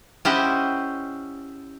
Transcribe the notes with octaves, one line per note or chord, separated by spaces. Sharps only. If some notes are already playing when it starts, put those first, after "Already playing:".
C#4 E4 G4 C5 D#5 F#5